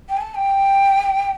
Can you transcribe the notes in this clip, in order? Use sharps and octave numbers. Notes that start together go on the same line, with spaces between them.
G5
G#5
A5
G5